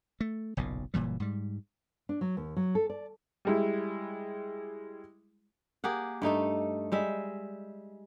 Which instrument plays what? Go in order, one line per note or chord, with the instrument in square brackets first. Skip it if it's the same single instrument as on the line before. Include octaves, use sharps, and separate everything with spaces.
[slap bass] A3
F#1 B1 A#2
F#1 A#2 E3 G3
G#2 G3
[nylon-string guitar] D4
F#3
D#2
F#3
A4
D5
[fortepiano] G3 G#3 E4
[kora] A#3 G4 G#4 F#5
G2 A3 D#4 A4
G3 G#3 E5